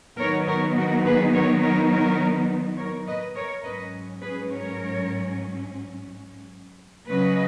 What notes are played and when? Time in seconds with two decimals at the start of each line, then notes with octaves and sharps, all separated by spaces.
0.18 D#3 F#3 B3 D#4 A#4 C#5
0.47 A#4 C#5
0.76 F#4 A#4
1.05 G#4 B4
1.33 A#4 C#5
1.63 A#4 C#5
1.91 A#4 C#5
2.77 A#4 C#5
3.07 B4 D#5
3.35 A#4 C#5
3.64 G#2 F#3 C#4 B4 D#5
4.22 G#4 B4
4.51 A#4 C#5
7.10 C#3 F#3 C#4 B4 D#5